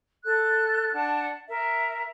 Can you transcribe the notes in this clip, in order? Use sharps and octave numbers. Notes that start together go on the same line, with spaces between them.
A4 F#6
D4 F#5 A5
A#4 E5